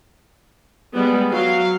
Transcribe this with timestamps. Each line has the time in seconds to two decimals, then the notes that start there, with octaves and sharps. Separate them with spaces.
0.94 G3 G#3 B3
1.29 F#3 F5